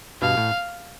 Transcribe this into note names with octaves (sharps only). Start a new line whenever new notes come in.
G2 B2 F5
A2